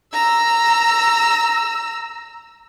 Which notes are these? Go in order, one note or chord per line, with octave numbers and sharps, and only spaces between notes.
A#5 E6